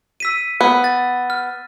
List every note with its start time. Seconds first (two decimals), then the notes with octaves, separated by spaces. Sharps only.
0.20 E6 B6 D#7
0.61 B3
0.84 A6
1.30 F6